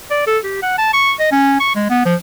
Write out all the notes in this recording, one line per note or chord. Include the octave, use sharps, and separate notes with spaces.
D5
A4
G4
F#5
A5
C#6
D#5
C#4
C#6
G#3
B3
F3